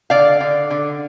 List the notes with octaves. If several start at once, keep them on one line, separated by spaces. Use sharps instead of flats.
D3 D5 F5
D3
D3